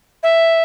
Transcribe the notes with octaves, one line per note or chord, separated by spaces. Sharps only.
E5